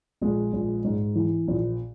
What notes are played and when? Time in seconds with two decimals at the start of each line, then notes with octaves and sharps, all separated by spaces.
0.21 A#1 G#3
0.53 A#1
0.84 G#2
1.15 E3
1.48 A#1